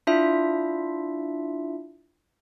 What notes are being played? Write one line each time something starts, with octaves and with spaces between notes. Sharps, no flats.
D4 E4 F4 E5